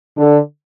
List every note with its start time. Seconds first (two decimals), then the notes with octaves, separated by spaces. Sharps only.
0.17 D3